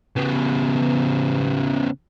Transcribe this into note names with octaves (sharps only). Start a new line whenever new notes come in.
C#3 B3